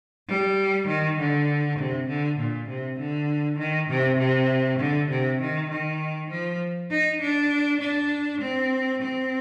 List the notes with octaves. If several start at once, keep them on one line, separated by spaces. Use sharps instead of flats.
G3
D#3
D3
C3
D3
A#2
C3
D3
D#3
C3
C3
D3
C3
D#3
D#3
F3
D#4
D4
D4
C4
C4